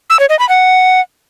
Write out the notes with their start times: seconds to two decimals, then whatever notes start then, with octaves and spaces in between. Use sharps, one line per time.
0.10 E6
0.20 C#5
0.29 D#5
0.39 B5
0.49 F#5